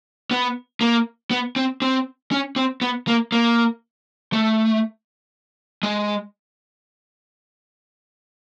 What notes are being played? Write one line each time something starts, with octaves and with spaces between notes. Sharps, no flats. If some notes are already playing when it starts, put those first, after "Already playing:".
B3
A#3
B3
C4
C4
C#4
C4
B3
A#3
A#3
A3
G#3